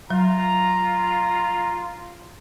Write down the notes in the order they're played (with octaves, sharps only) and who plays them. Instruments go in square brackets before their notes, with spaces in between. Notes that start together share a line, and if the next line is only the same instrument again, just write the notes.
[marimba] F#3 [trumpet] F4 [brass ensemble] A#5